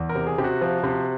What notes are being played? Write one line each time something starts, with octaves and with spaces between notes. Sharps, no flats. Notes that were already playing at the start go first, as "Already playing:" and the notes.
Already playing: E2
A#4
C3
G#4
C3 G4
F#4
F3
C3